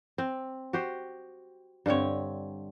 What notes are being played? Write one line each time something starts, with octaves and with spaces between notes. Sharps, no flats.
C4
F#4 G4 C5
G2 D3 C4 C#5